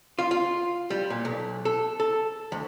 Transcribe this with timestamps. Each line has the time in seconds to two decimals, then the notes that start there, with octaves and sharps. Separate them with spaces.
0.19 F4
0.31 F4
0.90 G3
1.10 A#2
1.25 B1
1.65 A4
2.00 A4
2.52 D2